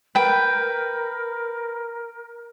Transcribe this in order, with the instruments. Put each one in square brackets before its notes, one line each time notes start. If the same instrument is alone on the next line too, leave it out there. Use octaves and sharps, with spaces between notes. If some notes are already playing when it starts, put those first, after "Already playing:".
[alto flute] A#4 [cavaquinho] B4 G5